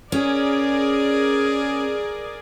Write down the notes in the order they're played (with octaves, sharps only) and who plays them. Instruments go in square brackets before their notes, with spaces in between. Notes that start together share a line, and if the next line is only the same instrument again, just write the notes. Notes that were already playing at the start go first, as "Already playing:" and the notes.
[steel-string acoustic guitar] C#4 [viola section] G#4 A#4 D5